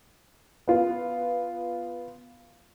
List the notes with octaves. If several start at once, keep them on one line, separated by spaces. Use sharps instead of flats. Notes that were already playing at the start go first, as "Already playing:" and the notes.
B3 F4